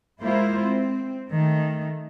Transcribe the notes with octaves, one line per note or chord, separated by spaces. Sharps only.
G#3 A#3 E4 F4 C5
C4
D#3 A3